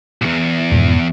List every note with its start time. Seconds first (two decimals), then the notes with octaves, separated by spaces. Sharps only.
0.22 B1 E2
0.72 F2 G#2 B2